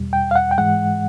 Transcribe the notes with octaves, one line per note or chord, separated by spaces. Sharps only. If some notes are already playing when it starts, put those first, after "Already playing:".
Already playing: E2 B2 G3
G5
F5
F#5
G5
G#2 E3 G#3 F#5